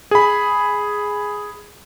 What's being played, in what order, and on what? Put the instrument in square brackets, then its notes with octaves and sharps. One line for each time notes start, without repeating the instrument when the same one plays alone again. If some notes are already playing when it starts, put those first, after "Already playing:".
[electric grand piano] G#4 B5